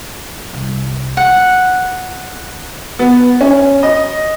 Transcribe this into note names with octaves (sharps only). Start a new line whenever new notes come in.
C2
D3 F#5
B3
C#4
D#5